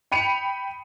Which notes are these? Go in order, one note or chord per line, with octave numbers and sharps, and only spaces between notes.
G5 B5 C#7 D#7 F7